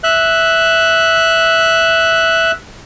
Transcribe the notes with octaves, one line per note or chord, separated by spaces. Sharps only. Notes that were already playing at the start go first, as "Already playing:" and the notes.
E5 F#6